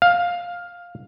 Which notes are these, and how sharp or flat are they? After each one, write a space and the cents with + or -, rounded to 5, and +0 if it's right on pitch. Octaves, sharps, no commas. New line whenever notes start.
F5 +10